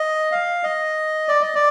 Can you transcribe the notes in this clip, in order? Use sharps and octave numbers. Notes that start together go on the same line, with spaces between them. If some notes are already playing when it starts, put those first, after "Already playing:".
Already playing: D#5
F5
D#5
D5
D#5
D5